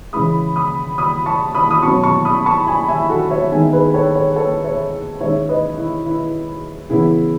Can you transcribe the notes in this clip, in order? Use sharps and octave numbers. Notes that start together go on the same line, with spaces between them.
C#3 E3 G#3 B5 D#6
B5 D#6
B5 D#6
A5 C#6
B5 D#6
D#6
B2 F#3 C#4 A5 C#6
A5 C#6
B5 D#6
A5 C#6
G#5 B5
E5 G#5
F#4 A4
C#5 E5
D#3 G#3 B3 E5 G#5
G#4 B4
A4 C#5
A4 C#5
A4 C#5
C#5 E5
D#3 G#3 C#4 C#5 E5
B4 D#5
E4
E4
C#3 E3 B3 E4 G#4